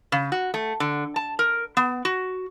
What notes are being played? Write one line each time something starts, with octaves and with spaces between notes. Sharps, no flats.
C#3
F#4
A3
D3
A5
A#4
B3
F#4